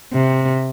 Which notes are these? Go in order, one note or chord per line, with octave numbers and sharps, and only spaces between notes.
C3